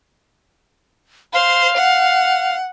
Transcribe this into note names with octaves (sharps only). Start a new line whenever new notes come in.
C5 F5
F#5